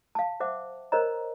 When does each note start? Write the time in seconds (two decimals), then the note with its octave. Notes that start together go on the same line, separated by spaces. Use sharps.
0.15 F5 A5
0.40 C5 E5 F#5 D6
0.92 A#4 C5 C#5 D#5 A#5